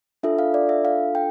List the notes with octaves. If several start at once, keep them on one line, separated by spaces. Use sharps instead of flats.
D4 F4 A4 E5
F5
D5
E5
F5
G5